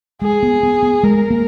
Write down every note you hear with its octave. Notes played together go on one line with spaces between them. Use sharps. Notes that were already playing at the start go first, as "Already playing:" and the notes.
G#3 G#4
B3
B3
B3
G#3 A#4
A#3